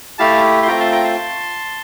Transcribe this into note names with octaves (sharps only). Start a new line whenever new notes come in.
A3 E4 G4 F5 A5
C6
A3 C4 F4 G5 A#5
A5 C6
G5 A#5
A5 C6